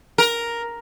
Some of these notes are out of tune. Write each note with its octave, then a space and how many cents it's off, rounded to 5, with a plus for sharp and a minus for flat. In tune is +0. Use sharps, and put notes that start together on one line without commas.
A#4 +5